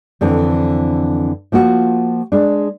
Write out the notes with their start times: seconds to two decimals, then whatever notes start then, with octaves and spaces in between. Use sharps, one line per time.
0.21 F2 D3 E3 C4
1.52 F3 A#3 F4 F#4
2.32 G#3 D4